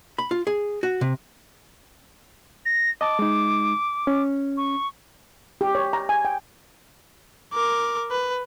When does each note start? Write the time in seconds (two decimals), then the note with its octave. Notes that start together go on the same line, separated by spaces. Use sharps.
0.18 B5
0.31 F4
0.47 G#4
0.83 F#4
1.01 C3
2.65 A#6
3.01 D#5 A5 D6
3.19 G#3 D#4
4.07 C#4
4.57 C#6
5.61 G4
5.75 C#5
5.93 A#5
6.09 G#5
6.25 G5
7.54 A#4 D6
8.11 B4